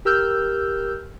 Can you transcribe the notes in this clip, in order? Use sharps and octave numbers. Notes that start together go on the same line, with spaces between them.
G4 A#4 E6 F6 G6